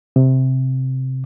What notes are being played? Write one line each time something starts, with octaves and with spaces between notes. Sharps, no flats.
C3